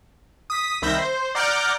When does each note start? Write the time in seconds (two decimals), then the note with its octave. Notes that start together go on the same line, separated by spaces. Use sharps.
0.50 D#6 B6
0.82 C2 D#3 E5 B5 G6 A#6
0.98 C5
1.35 D5 F#5 A#5 D6 F6 G6